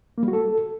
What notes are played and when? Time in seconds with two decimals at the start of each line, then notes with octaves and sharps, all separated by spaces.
0.18 A#3
0.23 G3
0.28 F#4
0.33 A4